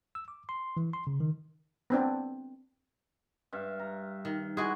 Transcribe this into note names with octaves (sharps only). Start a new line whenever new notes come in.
E6
D6
C6
E3
C6
C#3
D#3
B3 C4 D4
G2 E5 F5
A#5
D#3
G#3 E4 F#4 G#4